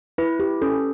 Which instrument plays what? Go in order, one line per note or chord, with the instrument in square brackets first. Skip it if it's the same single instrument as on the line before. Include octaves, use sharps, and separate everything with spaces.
[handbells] E4 [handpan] B4
[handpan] G4
[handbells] C#4 [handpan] A4